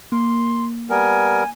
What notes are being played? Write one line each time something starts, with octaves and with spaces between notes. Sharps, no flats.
A#3 C6
G3 B3 A#4 G#5